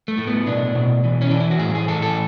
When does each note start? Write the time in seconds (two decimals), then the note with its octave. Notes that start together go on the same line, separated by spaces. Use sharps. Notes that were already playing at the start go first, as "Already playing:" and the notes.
0.08 A3
0.18 A2
0.27 B3
0.46 B2 D4
0.75 B2
1.04 E3
1.21 C#4
1.31 E3 D4
1.40 E4
1.51 F#4
1.59 A2 G#4
1.75 G#4
1.88 E3 A4
2.02 A4